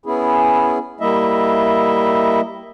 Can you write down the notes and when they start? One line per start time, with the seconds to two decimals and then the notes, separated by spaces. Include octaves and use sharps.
0.06 B3 C#4 E4 G#4
1.00 G3 A#3 E4 D#5 E5